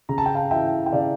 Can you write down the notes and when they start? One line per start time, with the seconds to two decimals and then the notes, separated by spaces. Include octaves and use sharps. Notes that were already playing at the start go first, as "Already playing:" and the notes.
0.09 C#3 A#5
0.18 A5
0.26 G5
0.35 F5 A5
0.51 E3 E5 G5
0.86 G5
0.93 C#3 D5 F5